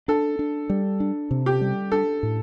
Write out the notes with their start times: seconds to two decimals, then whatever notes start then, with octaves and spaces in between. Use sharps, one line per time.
0.08 D4 A4
0.39 D4
0.70 G3
1.00 D4
1.31 C3
1.46 G4
1.61 G3
1.92 D4 A4
2.23 A2